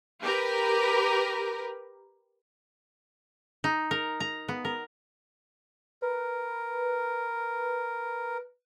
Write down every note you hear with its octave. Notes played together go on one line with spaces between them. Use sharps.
G4 A#4 B4
D#4
A#4
A#5
B3
A#4
A#4 B4